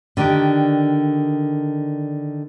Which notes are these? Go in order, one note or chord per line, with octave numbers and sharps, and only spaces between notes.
D3 D#3 D4 G4 G5